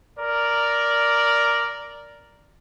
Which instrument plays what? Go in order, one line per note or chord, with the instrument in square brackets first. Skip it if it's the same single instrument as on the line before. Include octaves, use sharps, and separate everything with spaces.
[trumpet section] A#4 D5